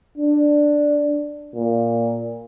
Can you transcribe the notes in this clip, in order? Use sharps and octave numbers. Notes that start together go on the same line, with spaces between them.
D4
A#2